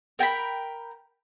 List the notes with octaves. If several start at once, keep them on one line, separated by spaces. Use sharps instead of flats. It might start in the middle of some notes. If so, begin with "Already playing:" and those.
A#4 G5 A5 B5